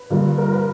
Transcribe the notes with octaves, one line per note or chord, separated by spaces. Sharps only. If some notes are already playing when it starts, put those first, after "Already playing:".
Already playing: B4
G2 D3 F3 A#3
A#4
B4